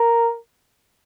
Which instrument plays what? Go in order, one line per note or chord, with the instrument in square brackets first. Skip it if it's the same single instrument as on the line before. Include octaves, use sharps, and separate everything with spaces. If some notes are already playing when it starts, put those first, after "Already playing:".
Already playing: [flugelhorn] A#4